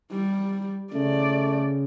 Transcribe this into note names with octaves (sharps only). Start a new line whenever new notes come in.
G3
C#3 A3 D5